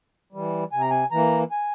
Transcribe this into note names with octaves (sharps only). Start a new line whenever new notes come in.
E3 G3
C3 G#5
A#5
G#5
E3 A#3 A#5
G#5